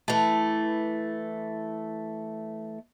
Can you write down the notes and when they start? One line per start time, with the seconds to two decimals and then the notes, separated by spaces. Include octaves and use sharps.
0.08 E3 A3